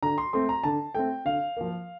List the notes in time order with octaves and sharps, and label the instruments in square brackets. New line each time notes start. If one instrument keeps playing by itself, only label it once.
[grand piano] D3 A#5
C6
A3 C4 C6
A#5
D3 A5
A3 C4 G5
D3 F5
F3 A#3